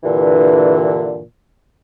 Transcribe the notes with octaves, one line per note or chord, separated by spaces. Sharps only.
G2 A#2 D3 E3